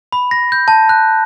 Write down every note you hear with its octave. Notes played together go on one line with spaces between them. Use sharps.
B5
A#6
G6
A5
F#6